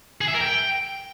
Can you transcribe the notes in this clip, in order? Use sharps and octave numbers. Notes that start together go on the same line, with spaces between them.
G#4
E5
A#4
G5